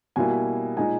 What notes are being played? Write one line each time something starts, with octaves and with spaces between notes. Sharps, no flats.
B2 G3 A#3 E4 G#5
A#2 G#3 D#4 G#5